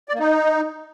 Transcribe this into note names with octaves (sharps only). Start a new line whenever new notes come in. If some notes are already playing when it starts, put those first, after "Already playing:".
D5
A#3
D#4